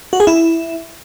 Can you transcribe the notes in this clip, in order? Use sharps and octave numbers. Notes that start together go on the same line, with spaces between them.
F#4
G#4
E4